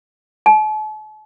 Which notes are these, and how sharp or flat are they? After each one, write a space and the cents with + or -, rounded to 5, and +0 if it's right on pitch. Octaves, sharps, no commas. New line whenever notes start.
A5 -45